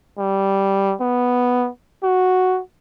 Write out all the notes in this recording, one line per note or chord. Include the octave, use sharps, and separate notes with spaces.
G3
B3
F#4